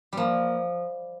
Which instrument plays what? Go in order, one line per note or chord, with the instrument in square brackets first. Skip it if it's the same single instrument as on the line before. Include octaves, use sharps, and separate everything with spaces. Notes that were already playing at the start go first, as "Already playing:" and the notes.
[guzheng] F3 G3 [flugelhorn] A#3